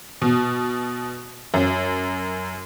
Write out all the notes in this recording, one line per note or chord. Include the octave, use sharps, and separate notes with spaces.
B2
F#2